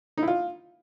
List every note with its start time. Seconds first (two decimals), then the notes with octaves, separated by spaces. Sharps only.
0.17 D#4
0.23 E4
0.28 F4